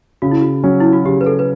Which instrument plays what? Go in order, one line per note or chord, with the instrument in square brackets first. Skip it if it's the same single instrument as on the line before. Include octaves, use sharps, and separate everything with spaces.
[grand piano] C#3 [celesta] F#4
[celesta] E4
F#4
[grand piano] F#3 C#4
[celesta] E4
F#4
[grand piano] C#3 [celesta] G4
[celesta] B4
A4
B4